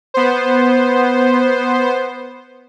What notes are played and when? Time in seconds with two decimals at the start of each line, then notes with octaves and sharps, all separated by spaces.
0.14 B3 C5